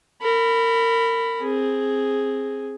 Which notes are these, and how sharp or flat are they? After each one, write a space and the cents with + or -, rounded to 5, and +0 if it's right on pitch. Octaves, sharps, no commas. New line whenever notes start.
A#4 -30 B5 +0
C4 +15 G#4 +0